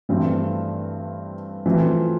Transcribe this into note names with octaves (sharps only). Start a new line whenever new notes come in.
G2 E3 A3 C4
E3 A3 C4 F4